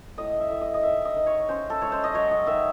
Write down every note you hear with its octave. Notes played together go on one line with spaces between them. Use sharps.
A2 D#5
E5
A2
D#5
D#5
D#3 E5
D#5
D#3
C#5
C#4 C5
A4
G#3 C#5
C5
D#5
F#3 C#5
D#5
D#3 E5